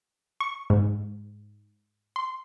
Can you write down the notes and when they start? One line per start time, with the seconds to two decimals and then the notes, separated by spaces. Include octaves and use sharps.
0.40 C#6
0.70 G#2
2.16 C6